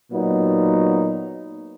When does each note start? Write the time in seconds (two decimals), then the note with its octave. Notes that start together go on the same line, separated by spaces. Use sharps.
0.12 A#2 F#3 B3 D#4